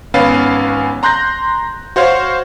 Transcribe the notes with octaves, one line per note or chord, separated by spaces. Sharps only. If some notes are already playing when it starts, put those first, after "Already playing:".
G#1 B3 C#4 B4 F5 A6
A#5 C6 F#6 G6 A#6
F#4 C5 C#5 F5